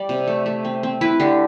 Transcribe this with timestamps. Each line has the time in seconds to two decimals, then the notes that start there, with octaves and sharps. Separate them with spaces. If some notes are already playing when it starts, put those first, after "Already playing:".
Already playing: G3 D5
0.09 C3
0.27 A3
0.46 A3
0.65 C4
0.83 C4
1.01 E4 B4
1.20 D3 G4